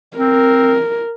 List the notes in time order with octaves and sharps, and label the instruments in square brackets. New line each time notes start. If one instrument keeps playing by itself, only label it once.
[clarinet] C4 [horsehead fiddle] A#4